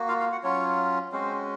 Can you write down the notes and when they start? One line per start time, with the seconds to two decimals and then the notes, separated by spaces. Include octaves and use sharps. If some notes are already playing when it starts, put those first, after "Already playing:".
Already playing: A#3 F#4
0.08 F4 F5
0.20 F4 F5
0.32 F#4 F#5
0.43 F#3 C#4 F4 C#5
1.12 G#3 C4 C#4 F#4 C5